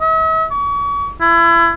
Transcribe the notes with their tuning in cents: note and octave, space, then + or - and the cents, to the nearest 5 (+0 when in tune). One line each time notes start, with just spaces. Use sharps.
E5 -45
C#6 +40
E4 +30